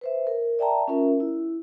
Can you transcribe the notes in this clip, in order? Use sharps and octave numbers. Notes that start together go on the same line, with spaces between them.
B4 C5 E5
A#4
D5 E5 G5 A5 A#5
C#4 F4 A#4 E5
E4